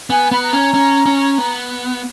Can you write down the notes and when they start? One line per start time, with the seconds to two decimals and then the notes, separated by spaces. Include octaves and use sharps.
0.10 B3 G#5
0.31 B3 B5
0.42 A#5
0.53 C#4
0.74 C#4
1.06 C#4
1.38 B3